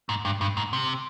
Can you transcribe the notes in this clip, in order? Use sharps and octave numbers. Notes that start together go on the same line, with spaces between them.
G#2
G2
G2
G#2
C3